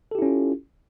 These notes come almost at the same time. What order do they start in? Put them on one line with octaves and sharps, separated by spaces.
A4 G4 E4 C#4 F4